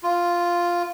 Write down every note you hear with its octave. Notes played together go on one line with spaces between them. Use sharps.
F4